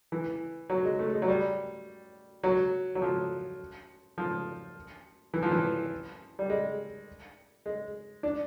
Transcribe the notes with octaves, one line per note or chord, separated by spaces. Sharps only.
E3
F#3
G#3
A3
G#3
F#3
G3
F#3
F#3
F3
F3
E3
F3
E3
G3
G#3
G#3
D4